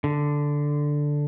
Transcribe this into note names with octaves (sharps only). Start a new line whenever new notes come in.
D3